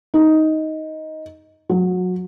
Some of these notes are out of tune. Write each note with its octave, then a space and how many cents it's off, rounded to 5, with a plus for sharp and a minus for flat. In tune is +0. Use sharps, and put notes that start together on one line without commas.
D#4 +10
F#3 -25